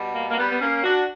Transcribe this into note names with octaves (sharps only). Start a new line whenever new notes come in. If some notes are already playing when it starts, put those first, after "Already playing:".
Already playing: B2 G3
A#3
A#3
G3 B3
B3
A#3 C#4
D4 F#4